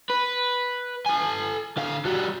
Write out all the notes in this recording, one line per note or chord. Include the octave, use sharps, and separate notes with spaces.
B4
A4 G#5
D3 F5
G3 F#4